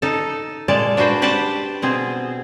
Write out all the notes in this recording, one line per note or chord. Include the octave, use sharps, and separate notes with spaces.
D#4 A4
A#2 G#3 D5 A5
D4 F#4 B4 C5 G5
G4 B4 C5 D5 F#5 A5
B2 C4 G#4